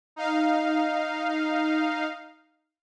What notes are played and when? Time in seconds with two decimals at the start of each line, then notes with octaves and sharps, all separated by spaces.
0.16 D#4 F5